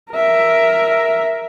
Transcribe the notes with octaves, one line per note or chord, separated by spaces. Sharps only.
A#4 E5